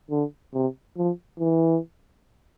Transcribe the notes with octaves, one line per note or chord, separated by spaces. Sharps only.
D3
C3
F3
E3